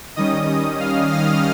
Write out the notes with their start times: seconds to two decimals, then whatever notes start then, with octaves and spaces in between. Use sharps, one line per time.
0.16 D#3 G3 C#4 D#5 D#6
0.48 D#5 D#6
0.80 F5 F6
1.12 F5 F6